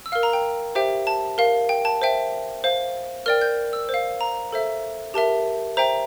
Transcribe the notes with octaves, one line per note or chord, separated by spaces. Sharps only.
E6
A#4 F5 F6
A#5
G5
G4 C5 E5 G5
A5
A#4 F5
G5
A5
C5 E5 G5
C5 F5
A#4 D5 G5 F6
G6
E6
C5
F5
A#5
A4 C5 E5
G4 A#4 E5 A5
C5 E5 G5 A#5